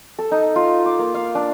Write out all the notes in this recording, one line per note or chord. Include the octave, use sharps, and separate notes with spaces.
A4
D#4
F4
D6
A#3
F5
D4